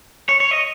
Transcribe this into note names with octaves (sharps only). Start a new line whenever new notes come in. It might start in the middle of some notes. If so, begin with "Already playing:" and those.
C#5
C#5
D#5